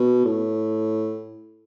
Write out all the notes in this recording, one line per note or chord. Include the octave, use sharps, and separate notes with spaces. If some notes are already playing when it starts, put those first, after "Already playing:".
Already playing: B2
A2